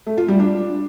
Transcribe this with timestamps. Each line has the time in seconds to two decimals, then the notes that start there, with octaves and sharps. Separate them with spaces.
0.07 A3
0.18 F4
0.28 G3
0.39 D4